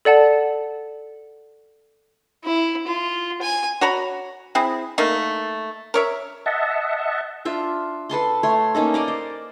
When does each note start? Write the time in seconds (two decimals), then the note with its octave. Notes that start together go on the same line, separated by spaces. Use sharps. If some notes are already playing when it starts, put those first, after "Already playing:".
0.05 A4 D5 F#5 A5
2.44 E4
2.87 F4
3.42 G#5
3.81 F#4 C#5 A#5 B5
4.55 C4 E4 G#4
4.98 A3 A#3 D#4
5.94 A#4 C#5 E5
6.46 D#5 E5 F#5 A5
7.45 D4 F4 E5
8.09 A4 B4 A5 C6
8.43 A3 C#5 C6
8.75 A#3 C#4 D#4 A4
8.94 A#4 D5 D#5
9.08 C5